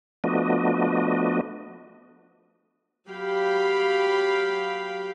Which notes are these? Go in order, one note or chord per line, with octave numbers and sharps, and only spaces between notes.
F3 A3 B3 D4 F#4 D#5
F#3 G4 F5 G5 B5